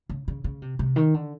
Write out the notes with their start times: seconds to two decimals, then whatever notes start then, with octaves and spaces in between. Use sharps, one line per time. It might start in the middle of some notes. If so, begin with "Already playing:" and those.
0.09 C#3
0.28 C#3
0.44 C#3
0.62 C3
0.79 C3
0.96 D#3
1.14 D3